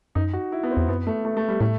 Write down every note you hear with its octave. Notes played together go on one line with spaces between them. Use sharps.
F#2 D#4
F#4
E4
B3
C4
E2
F#2 B3
A3
A3
A3
G3
A2 A3